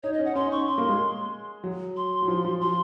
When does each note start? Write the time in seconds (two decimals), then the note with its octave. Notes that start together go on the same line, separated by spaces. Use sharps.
0.03 D#4 C#5
0.13 D#5
0.19 C#4
0.25 F#5
0.35 C#4 C6
0.46 D#4
0.51 C#6
0.57 C#4
0.67 C6
0.78 A#3
0.89 G#3
1.64 F#3
1.97 C6
2.23 F#3
2.28 F3
2.45 F3
2.61 F3 C6